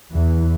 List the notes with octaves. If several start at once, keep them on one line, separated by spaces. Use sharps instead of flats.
E2 E3